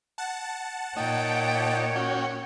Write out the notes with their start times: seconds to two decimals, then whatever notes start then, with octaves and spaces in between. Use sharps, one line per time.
0.18 F#5 A5
0.97 A#2 D#4 C#5 G5
1.96 C#4 F#4 G5